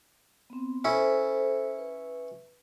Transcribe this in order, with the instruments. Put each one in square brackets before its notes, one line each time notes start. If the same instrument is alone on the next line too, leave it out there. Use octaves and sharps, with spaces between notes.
[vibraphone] B3 C4
[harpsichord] C#4 E4 [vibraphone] A4 C5
[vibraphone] B4